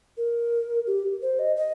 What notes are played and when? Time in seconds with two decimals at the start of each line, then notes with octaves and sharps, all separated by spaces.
0.17 A#4
0.87 G4
1.22 C5
1.39 D#5
1.56 D#5